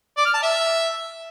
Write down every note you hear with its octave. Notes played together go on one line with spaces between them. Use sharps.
D5
F6
A5
E5